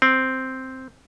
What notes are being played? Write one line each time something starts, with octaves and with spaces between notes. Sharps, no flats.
C4